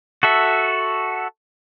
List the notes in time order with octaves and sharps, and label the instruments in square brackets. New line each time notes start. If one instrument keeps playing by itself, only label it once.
[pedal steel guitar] F#4 A4 E5